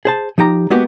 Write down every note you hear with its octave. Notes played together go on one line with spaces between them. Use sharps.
G#4 C5 A5
F3 D#4 G4 A#5
G#3 A#3 B3 F#4 G4